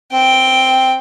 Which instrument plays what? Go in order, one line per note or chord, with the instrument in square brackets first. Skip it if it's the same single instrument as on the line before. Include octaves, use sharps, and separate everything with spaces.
[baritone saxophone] C4 [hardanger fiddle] G5